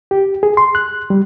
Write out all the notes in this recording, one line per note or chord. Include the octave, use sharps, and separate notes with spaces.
G4
G#4
C6
F#6
G3